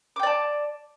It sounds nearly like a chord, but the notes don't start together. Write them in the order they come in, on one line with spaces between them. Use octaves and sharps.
D6 G5 D5 A5